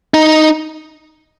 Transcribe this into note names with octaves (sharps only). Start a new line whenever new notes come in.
D#4